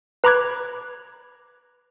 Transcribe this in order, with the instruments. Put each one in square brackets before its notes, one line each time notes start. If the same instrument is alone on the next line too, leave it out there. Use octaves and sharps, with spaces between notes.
[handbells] B4 A#5 B5 D6 F#6 G#6